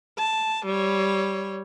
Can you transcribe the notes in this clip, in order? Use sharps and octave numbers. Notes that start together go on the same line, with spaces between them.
A5
G3 C#5